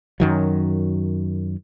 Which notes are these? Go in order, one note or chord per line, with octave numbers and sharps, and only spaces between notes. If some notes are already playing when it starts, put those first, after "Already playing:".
F#2 D#3 F#3